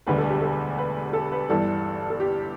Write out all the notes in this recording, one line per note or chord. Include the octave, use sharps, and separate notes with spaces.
E1 D2 D3 G3 B4
A4
G4
A4
B4
A4
B4
G1 G2 E3 G3 A4
A4
G4